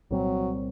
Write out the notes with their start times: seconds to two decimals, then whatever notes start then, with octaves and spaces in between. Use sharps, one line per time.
0.10 C2 A#2 F#3 G3 C4